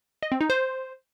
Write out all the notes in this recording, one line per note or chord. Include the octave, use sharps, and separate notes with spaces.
D#5
C4
D#4
C5